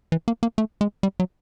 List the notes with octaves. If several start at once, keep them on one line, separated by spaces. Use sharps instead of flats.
E3
A#3
A#3
A3
G#3
G3
F#3